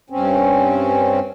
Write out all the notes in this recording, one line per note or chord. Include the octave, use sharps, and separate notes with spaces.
G2 C4 C#4